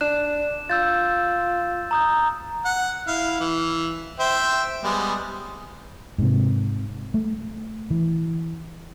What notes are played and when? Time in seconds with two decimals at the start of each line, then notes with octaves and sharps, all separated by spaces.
0.01 D4 F#6 E7
0.70 F4 E6 G6 A6
1.91 A#5 D#6 G6
2.65 F#5
3.07 E4 F5
3.40 E3
4.19 C5 E5 G5
4.84 G3 G#3 B3
6.18 G#2 C3
7.14 A3
7.91 E3